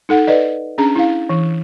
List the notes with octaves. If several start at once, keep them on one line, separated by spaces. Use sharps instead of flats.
D#4 A4 F#5
B4 D5 D#5
C#4 D4 G#4 A#5
E4 F5
E3